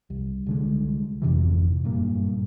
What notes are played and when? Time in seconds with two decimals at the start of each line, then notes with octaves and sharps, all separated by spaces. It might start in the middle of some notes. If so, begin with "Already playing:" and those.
0.10 C2
0.46 C2 D3 G#3
1.22 G#1 F2 C3 E3
1.84 F#1 G2 A#2